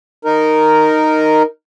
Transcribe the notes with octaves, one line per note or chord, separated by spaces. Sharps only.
D#4 A#4